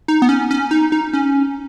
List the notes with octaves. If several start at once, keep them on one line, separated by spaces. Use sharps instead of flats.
D#4
B3
C#4
C#4
D#4
D#4
C#4